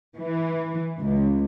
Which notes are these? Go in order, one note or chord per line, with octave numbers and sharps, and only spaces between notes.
E3
C#2